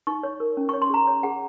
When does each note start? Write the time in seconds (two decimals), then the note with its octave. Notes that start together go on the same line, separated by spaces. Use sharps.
0.07 D#4 C#6
0.23 C#5
0.40 A#4
0.57 C#4
0.69 C#5 C#6
0.82 C6
0.90 G#4 A#5
1.07 C#5
1.23 G#4 F#5